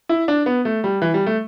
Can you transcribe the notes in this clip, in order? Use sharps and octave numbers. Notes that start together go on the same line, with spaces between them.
E4
D4
B3
A3
G3
E3
G3
A3